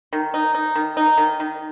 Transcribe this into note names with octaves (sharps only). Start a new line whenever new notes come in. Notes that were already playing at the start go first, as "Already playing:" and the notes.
D#3
D#4
D#4
D#3
D#4
D#3
D#3